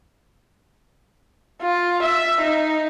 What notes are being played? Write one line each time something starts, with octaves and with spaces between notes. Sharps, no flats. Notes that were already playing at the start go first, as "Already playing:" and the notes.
F4
E5
D#4